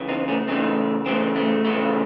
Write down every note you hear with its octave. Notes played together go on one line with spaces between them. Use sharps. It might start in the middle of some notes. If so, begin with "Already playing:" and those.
Already playing: C#2 C#3 E3
C4 D#4
A3 C#4
C#2 C#3 E3 A3 C4 D#4
C#2 C#3 E3 A3 C4
A3
C#2 C#3 E3 A3